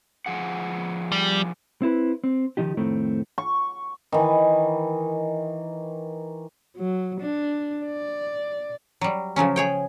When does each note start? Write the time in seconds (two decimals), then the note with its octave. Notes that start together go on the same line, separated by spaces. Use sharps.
0.26 F3 G#4 F#5
1.12 G3
1.82 C4 E4 B4
2.24 C4
2.57 C#2 D#3 F3 D#4 G4
2.77 F2 A2 D#3 A3 C4
3.38 C#6
4.12 D#3 E3
6.77 F#3
7.21 D4
7.86 D5
9.01 F#3 G3
9.36 C#3 F3 F#3 C#4
9.56 G#4 C#5 G5